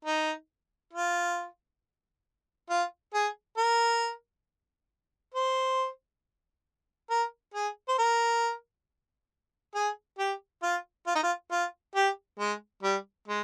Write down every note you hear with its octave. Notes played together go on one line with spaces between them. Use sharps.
D#4
F4
F4
G#4
A#4
C5
A#4
G#4
C5
A#4
G#4
G4
F4
F4
D#4
F4
F4
G4
G#3
G3
G#3